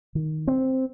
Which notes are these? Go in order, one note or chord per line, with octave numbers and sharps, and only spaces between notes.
D#3
C4